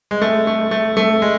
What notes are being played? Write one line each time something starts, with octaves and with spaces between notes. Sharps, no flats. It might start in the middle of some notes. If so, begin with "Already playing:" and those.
G#3
A3
A3
A3
A3
G#3